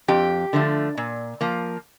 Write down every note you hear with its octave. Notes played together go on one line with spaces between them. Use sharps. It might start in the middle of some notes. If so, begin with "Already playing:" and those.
F2 G4
D3 F3 A3
A#2
F3 A#3